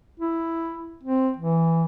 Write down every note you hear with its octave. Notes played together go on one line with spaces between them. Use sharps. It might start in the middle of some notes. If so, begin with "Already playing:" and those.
E4
C4
E3